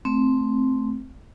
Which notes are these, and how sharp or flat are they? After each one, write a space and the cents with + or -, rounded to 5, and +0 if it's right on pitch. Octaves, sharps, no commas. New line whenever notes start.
A3 -10 C4 +0